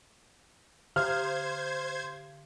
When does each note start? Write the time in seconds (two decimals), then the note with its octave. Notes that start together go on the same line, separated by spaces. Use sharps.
0.96 D3 C5 F6 G#6